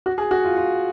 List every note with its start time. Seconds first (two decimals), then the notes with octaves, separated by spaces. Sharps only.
0.06 F#4
0.18 G#4
0.31 F#4
0.44 F4
0.57 F4